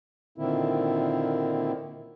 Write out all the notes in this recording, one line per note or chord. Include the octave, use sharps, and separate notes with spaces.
A#2 D3 D#3 A#3 C4 E4